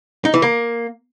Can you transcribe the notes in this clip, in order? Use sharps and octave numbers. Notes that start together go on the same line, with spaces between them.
D#4
E3
A#3